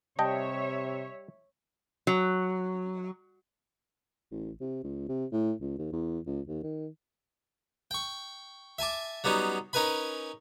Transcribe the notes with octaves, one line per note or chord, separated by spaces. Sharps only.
C3 G3 C#5 D#5 E5 G5 A5
F#3
A1
C3
C#2
C3
A2
C#2
D#2
E2
C#2
D#2
D#3
G5 C#6
E5 G#5 A5 D6
F#3 G3 B3 C#4 D#4
C#4 D#4 A#4 B4 G#5 B5